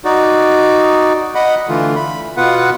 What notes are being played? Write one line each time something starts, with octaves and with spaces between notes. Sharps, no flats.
D#4 F#4 D5
D#5 F#5 B5
D3 E3 A3 F4
B5
B2 B3 F4 B4 F#5